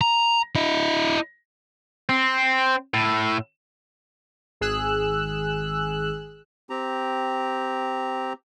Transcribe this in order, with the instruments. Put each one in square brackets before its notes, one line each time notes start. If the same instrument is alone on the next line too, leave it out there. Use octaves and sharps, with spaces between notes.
[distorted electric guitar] A#5
E4 D#5
C4
A2
[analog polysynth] G#1 G#4 E6 F#6
[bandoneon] C4 G4 A#5